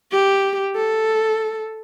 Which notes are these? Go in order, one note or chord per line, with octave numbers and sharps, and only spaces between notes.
G4
A4